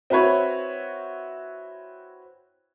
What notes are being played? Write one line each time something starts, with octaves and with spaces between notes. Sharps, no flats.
C4 E4 F#4 B4 C#5